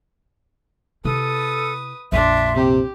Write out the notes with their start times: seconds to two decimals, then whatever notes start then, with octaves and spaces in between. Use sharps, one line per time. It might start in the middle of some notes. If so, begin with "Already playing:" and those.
1.05 C3 E4 A4 B4 D#6
2.12 A#1 F2 D4 E5 C6
2.56 C3 G4